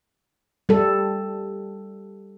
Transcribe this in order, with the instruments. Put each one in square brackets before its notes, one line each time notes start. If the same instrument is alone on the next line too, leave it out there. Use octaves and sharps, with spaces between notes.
[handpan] G3 A4